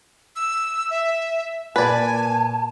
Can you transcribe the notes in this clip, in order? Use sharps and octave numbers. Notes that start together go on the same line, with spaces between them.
E6
E5
A#2 B4 D5 G#5 A5